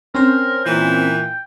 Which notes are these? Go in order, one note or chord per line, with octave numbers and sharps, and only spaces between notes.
C4 C#4 A#4 C5
A#2 E3 G5